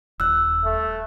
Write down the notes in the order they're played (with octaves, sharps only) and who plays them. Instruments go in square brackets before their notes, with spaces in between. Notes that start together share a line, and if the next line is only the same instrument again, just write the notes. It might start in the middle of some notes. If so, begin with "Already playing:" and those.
[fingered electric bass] D#1 [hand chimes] E6 F#6
[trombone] A3